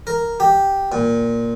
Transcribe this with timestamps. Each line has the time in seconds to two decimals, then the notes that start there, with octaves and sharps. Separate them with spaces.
0.07 A#4
0.40 G4
0.92 A#2